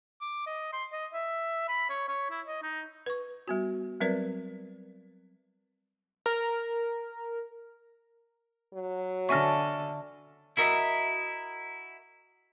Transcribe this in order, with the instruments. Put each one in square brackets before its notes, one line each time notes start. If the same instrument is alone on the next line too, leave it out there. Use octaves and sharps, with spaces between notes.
[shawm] D6
D#5
C6
D#5
E5
B5
C#5
C#5
E4
D#5
D#4
[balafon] B4 C#6
G3 B3 F#4
F#3 G3 C4 A#4 B4 D5
[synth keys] A#4
[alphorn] F#3
[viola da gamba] D3 A4 [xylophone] E5 G#5 A#6 [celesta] C#6 F6
[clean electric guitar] E4 F#4 A#4 D#5 E5